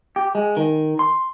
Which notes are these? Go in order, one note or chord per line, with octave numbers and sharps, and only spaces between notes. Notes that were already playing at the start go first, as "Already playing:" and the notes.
G4
G#3
D#3
C6